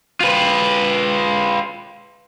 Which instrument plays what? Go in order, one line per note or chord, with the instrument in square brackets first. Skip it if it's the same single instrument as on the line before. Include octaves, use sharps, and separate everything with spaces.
[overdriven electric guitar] F4 B4